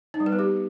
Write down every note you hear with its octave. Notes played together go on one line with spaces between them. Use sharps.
D#4
G3
B4
B3
G4